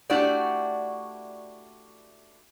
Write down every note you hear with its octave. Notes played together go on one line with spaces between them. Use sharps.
A3 D4 E4 F#4 G4 D5